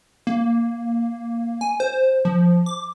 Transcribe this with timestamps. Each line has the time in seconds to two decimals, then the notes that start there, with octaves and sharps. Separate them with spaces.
0.27 A#3
1.61 G#5
1.80 C5
2.25 F3
2.66 D6